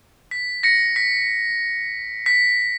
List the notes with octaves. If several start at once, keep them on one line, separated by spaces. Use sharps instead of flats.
B6
A#6 C#7
B6
B6